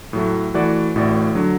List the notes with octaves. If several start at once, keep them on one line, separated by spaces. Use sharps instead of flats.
A2 F#3 A3
E3 A3 F#4 D5
A1 A2 A3 F#4 D5
D3 F#3